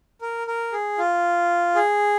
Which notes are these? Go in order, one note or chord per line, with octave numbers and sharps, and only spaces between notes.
A#4
A#4
G#4
F4
G#4